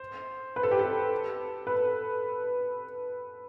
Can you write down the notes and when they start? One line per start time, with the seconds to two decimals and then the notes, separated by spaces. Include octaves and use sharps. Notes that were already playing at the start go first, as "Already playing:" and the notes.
Already playing: C5
0.56 B4
0.63 A4
0.71 G4
0.79 A4
1.67 B4